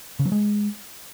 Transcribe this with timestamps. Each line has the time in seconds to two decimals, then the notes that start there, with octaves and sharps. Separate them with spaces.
0.19 C#3
0.26 F#3
0.32 G#3